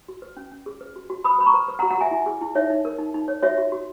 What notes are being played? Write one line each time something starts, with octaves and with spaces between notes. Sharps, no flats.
F#4
B4
C#4
C#4
G#4
B4
F#4
F#4
B4 B5 D#6
B4 B5
A#5 C#6
B4
B4
F#5 A#5
F#4
F#5 A#5
F#4 E5 G#5
E4
G#4
E4
D#4 C#5 E5
D#4
A#4
D#4
D#4
C#5
F#4 C#5 E5
F#4
F#4